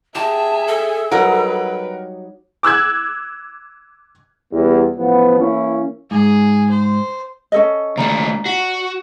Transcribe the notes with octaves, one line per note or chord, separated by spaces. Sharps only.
G4 G#4 E5 A5
A4
F#3 G3 D#4 A#4 B4 F#5
D6 E6 F#6 G#6
E2 G3 B3
A1 F3 B3
E3 A#3 C#4 E4
G#2 G#4
C5
C#4 A4 D#5
D#2 A3 D5 A#5
F#4